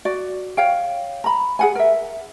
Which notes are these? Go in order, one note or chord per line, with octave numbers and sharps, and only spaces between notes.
F#4 D5
C#5 F5 G5
A#5 B5
G#4 F#5 G#5
A#4 E5